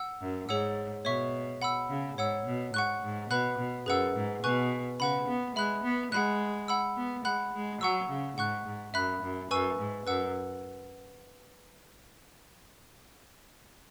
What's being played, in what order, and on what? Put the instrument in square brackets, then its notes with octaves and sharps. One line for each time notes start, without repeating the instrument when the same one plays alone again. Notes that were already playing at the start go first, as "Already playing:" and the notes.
Already playing: [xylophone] F#5 E6
[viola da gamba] F#2
[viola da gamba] G#2 [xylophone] G#4 C#5 F#5 E6
[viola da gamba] B2 [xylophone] C#5 E5 C#6
[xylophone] F#5 B5 E6
[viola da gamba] C#3
[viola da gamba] G#2 [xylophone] C#5 F#5 E6
[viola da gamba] B2
[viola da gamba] G#2 [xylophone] F#5 C#6 F#6
[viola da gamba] G#2
[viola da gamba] B2 [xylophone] B4 F#5 B5 F#6
[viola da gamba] B2
[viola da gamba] F#2 [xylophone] G#4 B4 F#5 E6
[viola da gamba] G#2
[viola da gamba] B2 [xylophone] B4 G#5 C#6 F#6
[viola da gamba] C#3 [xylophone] B4 F#5 B5
[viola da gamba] B3
[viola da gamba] G#3 [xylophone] E5 B5 F#6
[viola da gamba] B3
[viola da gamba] G#3 [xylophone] F#5 B5 F#6
[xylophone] F#5 B5 E6
[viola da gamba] B3
[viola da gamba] G#3 [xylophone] F#5 B5 F#6
[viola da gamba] G#3
[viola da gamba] F#3 [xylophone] F#5 C#6 E6
[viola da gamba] C#3
[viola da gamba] G#2 [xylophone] F#5 C#6 F#6
[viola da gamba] G#2
[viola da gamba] F#2 [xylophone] E5 B5 F#6
[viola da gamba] F#2
[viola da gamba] F#2 [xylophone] B4 G#5 C#6 E6
[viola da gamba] G#2
[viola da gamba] F#2 [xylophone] B4 F#5 E6